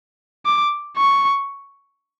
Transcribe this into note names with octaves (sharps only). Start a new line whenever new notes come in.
D6
C#6